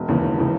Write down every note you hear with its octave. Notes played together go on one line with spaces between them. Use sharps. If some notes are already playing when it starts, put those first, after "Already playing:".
Already playing: E1
D#2 C#3 E3
E1
C#3 E3